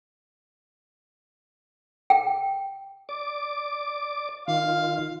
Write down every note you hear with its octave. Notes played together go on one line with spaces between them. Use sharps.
G5
D5 D6
D#3 F4 F5